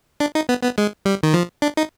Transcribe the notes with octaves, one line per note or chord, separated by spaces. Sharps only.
D4
D#4
B3
B3
G#3
G3
D#3
F3
D4
D#4